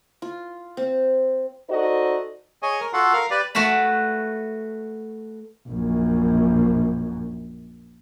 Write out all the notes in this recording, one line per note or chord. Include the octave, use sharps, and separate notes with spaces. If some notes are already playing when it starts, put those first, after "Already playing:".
F4
C4
D#4 F#4 A4 C5 D5 D#5
G#4 C#5 D#5 G#5
A#4
F4 F#4 A4 F#5 C6
A#4 F5
G4 B4 D5
A3 F#4 B4 A5 B5
A#1 F#2